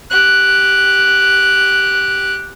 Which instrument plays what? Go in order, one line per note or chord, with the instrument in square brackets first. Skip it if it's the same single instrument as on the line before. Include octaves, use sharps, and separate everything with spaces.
[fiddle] G4 F#6